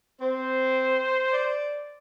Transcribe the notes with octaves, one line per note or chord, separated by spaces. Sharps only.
C4 C5
D5